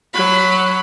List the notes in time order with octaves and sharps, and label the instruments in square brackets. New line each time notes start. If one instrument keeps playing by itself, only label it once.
[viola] F#3 B5